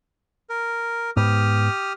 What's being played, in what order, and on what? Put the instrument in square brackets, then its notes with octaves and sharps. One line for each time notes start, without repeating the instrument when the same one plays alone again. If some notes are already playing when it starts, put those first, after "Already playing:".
[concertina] A#4
[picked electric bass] G#2 B3 [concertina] G4 D#6 F6